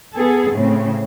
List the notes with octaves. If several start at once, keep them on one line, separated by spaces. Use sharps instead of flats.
B3 G#4 A4
A2 C#3 C4